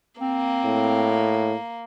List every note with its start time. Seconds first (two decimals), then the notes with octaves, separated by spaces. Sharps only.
0.21 A#3 C4
0.65 A2